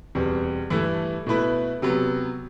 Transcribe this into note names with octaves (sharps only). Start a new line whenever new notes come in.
E2 B2 G3 C4
G2 E3 A3 E4 A4
B2 A3 E4 B4
C3 F#3 B3